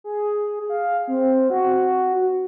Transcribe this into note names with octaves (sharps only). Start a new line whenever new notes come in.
G#4
F5
C4
F#4